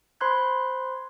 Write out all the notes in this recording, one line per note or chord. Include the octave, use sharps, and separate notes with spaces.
C5 B5 C6 F#6 G#6